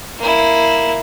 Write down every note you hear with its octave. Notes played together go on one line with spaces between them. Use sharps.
A#3 E4